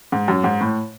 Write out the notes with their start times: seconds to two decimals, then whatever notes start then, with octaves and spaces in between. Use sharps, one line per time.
0.12 G#2
0.28 F#2
0.44 G#2
0.61 A2